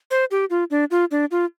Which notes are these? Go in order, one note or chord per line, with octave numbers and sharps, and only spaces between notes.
C5
G4
F4
D4
F4
D4
F4